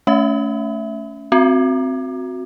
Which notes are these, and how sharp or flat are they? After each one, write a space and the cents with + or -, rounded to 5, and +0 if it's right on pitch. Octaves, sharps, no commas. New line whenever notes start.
A3 +0 C#4 +20 E5 +0
C4 +0 F#4 -15